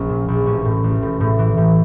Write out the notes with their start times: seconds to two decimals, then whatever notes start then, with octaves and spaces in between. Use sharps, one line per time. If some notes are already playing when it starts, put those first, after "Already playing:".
Already playing: A#1 C#4
0.09 A#2
0.28 A#1
0.46 A1 C#4
0.65 A2
0.84 A1
1.02 A2
1.20 A2
1.39 E3
1.57 A2